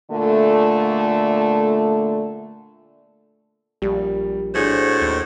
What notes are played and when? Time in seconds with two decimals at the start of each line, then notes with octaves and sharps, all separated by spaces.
0.11 A#2 D3 A3
3.82 A#1 G3
4.55 A2 D4 F#4 G#4 C5
5.01 D#2